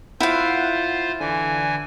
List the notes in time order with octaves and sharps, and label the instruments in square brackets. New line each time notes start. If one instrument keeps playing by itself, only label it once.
[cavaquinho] E4 F5 [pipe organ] F4 C5 [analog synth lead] F#5
[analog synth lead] D3 [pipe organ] E3 G#5